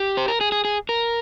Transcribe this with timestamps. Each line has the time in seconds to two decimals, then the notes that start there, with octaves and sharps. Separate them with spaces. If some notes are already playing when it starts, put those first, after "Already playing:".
Already playing: G4
0.17 C5
0.28 A#4
0.41 G#4
0.52 G#4
0.65 G#4
0.89 A#4